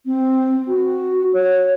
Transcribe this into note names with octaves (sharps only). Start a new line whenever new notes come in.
C4
F#4
C#5